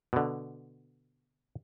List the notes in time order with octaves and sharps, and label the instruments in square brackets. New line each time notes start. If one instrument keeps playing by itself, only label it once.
[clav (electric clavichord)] B2 D3